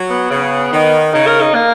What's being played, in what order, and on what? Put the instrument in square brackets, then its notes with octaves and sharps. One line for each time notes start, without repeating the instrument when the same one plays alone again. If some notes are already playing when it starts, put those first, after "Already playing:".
Already playing: [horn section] F#3
[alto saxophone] B3
[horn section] C#3
D#3
[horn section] C#3 [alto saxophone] D#4
[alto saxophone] A#4
D#4
A#3